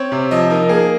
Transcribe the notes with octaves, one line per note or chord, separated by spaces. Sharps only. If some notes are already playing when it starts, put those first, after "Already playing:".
Already playing: C4 C#5
C3
F3 D#5
D#4 A#4
A#3 G#4